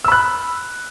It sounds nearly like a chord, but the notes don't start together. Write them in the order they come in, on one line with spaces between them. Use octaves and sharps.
E6 B5 F#6